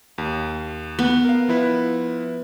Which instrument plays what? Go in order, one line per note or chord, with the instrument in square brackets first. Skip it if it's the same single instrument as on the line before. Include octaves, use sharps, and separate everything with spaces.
[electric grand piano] D#2
[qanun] B3
[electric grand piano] A#4 F5
F3 E4 B4